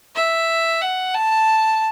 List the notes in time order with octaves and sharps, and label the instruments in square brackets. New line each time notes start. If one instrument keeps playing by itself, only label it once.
[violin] E5
F#5
A5